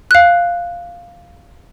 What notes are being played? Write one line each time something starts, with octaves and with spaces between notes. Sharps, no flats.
F5 F#6